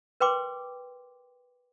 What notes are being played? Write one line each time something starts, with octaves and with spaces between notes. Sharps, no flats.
A#4 B4 G5 C6 D6